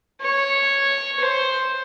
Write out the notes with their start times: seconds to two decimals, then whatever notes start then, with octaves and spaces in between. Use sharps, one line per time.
0.21 C#5
1.20 C5